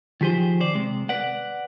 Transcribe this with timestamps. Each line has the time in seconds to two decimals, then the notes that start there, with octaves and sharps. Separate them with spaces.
0.21 D#3 F3 G4 G#4 C5
0.61 C5 D5
0.75 C3 G#3
1.09 B4 D5 F#5